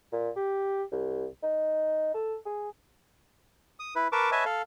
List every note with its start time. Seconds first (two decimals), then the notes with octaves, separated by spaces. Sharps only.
0.12 A#2
0.36 G4
0.91 C2
1.43 D#4
2.14 A4
2.46 G#4
3.80 D#6
3.95 E4 B4
4.12 A#4 B4 A5 C#6 D6
4.32 B4 C#5 D#5 E5 G#5 A5
4.45 A4 F5